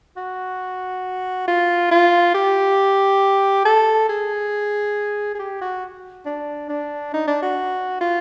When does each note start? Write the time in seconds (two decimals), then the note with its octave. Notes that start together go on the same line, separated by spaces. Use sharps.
0.17 F#4
1.48 F4
1.91 F4
2.34 G4
3.65 A4
4.09 G#4
5.35 G#4
5.39 G4
5.61 F#4
6.26 D4
6.69 D4
7.14 D#4
7.28 D4
7.42 F#4
8.01 F4